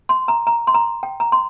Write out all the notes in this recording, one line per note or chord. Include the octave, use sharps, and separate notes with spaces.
C6
A#5
A#5
C6
A#5
G5
A#5
C6